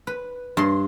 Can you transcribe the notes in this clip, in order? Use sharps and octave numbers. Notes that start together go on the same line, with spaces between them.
B4
G2 C6